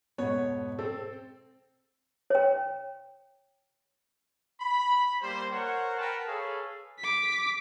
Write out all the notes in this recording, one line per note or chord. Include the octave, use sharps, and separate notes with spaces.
F2 G#2 B2 B3 C#5
C4 A4
C#5 G5
B5
G3 A#3 C5
A#4 C5 C#5 F#5
A#4 B4 F#5 G5 A5
G#4 A4 B4 C#5 F5
D6 B6